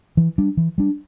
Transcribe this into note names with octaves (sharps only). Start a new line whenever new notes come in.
E3
G3 D4
E3
G3 D4